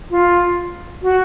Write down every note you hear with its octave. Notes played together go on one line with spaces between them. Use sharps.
F4
F#4